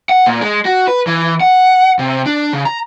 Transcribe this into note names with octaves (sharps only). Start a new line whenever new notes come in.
F#5
A#2
G#3
F#4
B4
E3
F#5
C3
D4
C#3
A#5